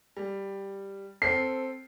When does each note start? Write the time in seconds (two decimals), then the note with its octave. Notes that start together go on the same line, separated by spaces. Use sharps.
0.17 G3
1.22 C4 A4 C7